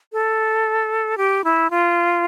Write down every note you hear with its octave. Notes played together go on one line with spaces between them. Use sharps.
A4
G4
E4
F4